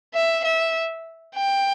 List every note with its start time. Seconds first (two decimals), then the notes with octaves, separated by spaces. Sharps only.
0.14 E5
0.44 E5
1.35 G5